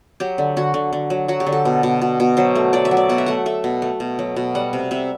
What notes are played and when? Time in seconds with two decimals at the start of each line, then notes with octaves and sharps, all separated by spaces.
0.20 F#3 G4
0.38 D3
0.56 D3 F#4
0.74 D3
0.93 D3
1.10 F#3
1.28 F#3 F#4
1.40 G4
1.47 D3
1.52 A4
1.65 B2
1.83 B2
2.02 B2
2.20 B2
2.37 F#3 C5
2.55 A3
2.73 F#3 D5
2.85 E5
2.91 F#3
2.97 D5
3.09 B2 F#5
3.18 E5
3.26 A3 F#5
3.46 A3 E5
3.64 B2
3.82 A3
4.00 B2
4.19 F#3
4.36 B2
4.55 G3 F#5
4.73 C3
4.91 C3 E5